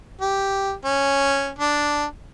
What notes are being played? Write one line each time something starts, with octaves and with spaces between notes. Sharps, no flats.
G4
C#4
D4